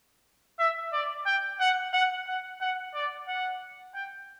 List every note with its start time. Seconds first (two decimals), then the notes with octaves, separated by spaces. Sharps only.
0.59 E5
0.93 D5
1.26 G5
1.60 F#5
1.93 F#5
2.27 F#5
2.61 F#5
2.94 D5
3.27 F#5
3.95 G5